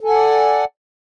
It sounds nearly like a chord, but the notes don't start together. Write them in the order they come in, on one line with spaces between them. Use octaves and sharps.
A4 G#5 F#5 D5